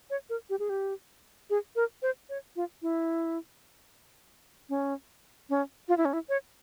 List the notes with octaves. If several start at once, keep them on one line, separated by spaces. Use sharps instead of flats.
C#5
A#4
G4
G#4
G4
G#4
A#4
C5
C#5
F4
E4
C#4
C#4
F4
E4
C#4
E4
C#5